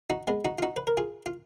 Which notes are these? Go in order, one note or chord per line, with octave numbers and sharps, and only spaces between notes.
D#4 F#4
G#3 B3
D#4 F#4
F4
D#4 F#4
B4
A#4
F4 G#4
F4